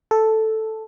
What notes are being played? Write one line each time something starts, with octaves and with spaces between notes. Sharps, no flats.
A4